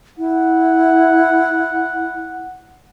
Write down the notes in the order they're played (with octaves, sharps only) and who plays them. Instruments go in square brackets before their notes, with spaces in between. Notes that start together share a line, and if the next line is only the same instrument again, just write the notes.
[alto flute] E4 [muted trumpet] F#5